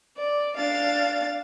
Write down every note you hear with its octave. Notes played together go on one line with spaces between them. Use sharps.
D5
D4 F5 A6